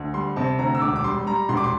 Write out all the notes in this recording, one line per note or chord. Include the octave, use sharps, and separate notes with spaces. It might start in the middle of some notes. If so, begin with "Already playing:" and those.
Already playing: D2
G3 C6
C3 A5
D2 A#5
E6
E1 D6
D6
G3 C6
G3 A#5
E1 C6
D6
C6